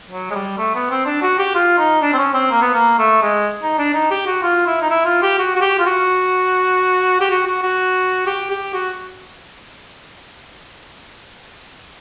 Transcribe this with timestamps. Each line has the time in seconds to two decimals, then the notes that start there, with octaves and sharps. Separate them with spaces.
0.11 F#3
0.31 G#3
0.35 G3
0.58 A3
0.75 B3
0.91 C4
1.06 D4
1.22 F#4
1.39 G4
1.55 F4
1.78 D#4
2.02 D4
2.14 C4
2.18 C#4
2.34 C4
2.51 A#3
2.62 B3
2.74 A#3
2.99 A3
3.22 G#3
3.62 D#4
3.78 D4
3.94 D#4
4.11 G4
4.27 F#4
4.42 F4
4.67 E4
4.82 D#4
4.90 E4
5.06 F4
5.23 G4
5.39 F#4
5.56 F#4
5.62 G4
5.79 F4
5.86 F#4
7.21 G4
7.30 F#4
7.46 F#4
7.62 F#4
8.27 G4
8.51 G4
8.74 F#4